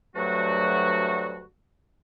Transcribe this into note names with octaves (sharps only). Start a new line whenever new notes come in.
D2 G2 F#3 A3 F#4